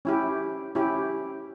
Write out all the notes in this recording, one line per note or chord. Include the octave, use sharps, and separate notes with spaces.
C#4 E4 G4
C#4 E4 G4